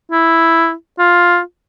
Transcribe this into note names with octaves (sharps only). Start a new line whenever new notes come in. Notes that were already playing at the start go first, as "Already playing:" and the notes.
E4
F4